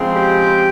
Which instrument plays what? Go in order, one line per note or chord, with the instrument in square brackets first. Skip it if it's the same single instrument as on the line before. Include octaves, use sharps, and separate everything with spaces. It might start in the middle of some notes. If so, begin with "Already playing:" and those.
Already playing: [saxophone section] C#3 F3 G#3 C4
G4